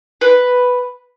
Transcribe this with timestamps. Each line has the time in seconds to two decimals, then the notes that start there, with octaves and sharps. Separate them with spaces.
0.21 B4